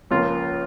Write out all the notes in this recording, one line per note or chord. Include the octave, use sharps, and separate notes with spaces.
C#2 C#3 F3 A#3 F4